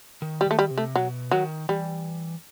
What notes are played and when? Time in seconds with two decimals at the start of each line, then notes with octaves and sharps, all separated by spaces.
0.22 D#3
0.41 G3
0.46 D#3 A3
0.59 G3
0.70 C3
0.78 A3
0.96 B2 F#3
1.31 D#3 F#3
1.69 E3 G3